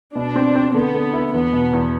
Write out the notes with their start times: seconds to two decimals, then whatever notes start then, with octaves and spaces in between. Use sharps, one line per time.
0.15 B2 D4
0.36 C4
0.55 C4
0.74 D3 B3
0.94 D3
1.13 E4
1.34 E2 B3
1.53 B2
1.73 E2